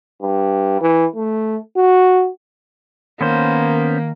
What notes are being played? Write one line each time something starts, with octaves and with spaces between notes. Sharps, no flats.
G2
E3
A3
F#4
D#3 A#3 B3 C#4 C5